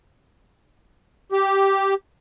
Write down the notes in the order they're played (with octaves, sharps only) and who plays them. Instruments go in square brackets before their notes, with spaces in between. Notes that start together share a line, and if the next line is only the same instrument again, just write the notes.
[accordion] G4